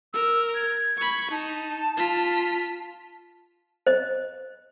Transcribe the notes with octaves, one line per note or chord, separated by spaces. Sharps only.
A#4 E6
G#6
B5 C#6
D#4 A5
F4 B6
C5 D#5